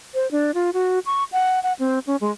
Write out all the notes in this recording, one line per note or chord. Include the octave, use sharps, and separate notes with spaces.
C5
D4
F4
F#4
C#6
F#5
F#5
C4
C#4
G#3